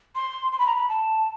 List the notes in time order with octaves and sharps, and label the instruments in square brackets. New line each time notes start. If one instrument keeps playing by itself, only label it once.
[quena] C6
C6
B5
A#5
B5
A5